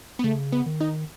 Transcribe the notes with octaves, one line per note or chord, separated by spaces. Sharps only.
B3
C#3 A3
B3
D#3
D#4